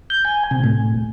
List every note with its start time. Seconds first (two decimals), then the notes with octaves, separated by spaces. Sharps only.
0.10 G6
0.25 G#5
0.51 C3
0.64 A2